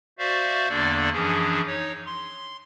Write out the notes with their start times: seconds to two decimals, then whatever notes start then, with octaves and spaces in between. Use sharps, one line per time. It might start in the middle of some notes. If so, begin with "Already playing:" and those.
0.19 F#4 C5 D5 E5 F5
0.69 E2 D3 A#3 D4 A4 D5
1.13 F#2 E3 F3 C#4 D4 G#4
1.66 D#4 C#5
2.06 C6